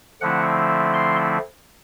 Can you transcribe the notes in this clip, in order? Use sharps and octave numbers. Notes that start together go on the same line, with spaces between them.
D3 F3 A3 C4 E4 F#5
C6